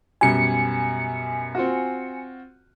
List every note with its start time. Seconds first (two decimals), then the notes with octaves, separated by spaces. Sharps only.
0.21 F#2 B2 G3 G#5 C#7
1.55 C4 F4 F#4